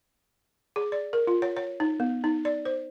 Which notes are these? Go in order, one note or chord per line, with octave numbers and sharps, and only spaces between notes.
G#4
D5
A#4
F4
C#5
C#5
D#4
B3
D#4
D5
C5